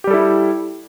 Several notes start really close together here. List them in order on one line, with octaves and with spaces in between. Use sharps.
G4 G3 A4 E4